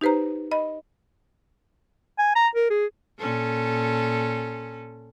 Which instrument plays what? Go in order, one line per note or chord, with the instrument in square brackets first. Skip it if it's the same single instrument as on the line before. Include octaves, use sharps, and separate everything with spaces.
[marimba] D#4 G4 B4 C5 A#5
D#5 B5
[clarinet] G#5
A#5
A#4
G#4
[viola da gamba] A#2 C#4 A4